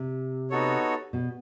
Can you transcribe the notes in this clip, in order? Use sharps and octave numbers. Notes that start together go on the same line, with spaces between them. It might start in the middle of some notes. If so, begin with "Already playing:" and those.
Already playing: C3
B3 D#4 F#4 A4 C#5
B2